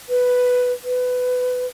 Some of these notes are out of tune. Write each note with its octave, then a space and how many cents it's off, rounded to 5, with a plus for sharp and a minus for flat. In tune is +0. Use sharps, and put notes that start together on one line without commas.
B4 +5
B4 +20